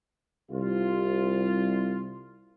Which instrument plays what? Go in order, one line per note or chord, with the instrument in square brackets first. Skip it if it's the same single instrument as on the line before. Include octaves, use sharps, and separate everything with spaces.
[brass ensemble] C2 F4